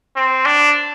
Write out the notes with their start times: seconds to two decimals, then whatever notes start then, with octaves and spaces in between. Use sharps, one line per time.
0.16 C4
0.45 D4